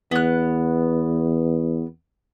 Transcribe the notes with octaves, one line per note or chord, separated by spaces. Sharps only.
E2 B3 F#6